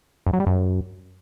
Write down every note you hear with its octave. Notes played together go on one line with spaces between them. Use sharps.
F#2
F#3
G3
F#2